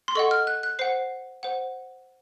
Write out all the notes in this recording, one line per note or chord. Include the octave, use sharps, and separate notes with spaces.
C6
A4 D#5 F#5 C#6
F6
F#6
F#6
C5 F#5 C7
C5 F#5